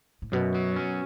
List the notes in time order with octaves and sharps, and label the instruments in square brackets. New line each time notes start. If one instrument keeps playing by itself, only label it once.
[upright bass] A2
[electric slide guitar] F#2 [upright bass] B2
[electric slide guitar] F#3
C#4